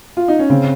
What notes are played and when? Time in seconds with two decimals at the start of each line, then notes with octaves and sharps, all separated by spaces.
0.17 F4
0.28 D#4
0.39 C#4
0.49 C#3 C4